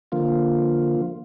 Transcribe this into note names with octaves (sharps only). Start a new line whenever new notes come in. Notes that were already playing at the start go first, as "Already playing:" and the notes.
D3 F3 A#3 F4